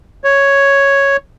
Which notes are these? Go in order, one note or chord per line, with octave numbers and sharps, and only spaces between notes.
C#5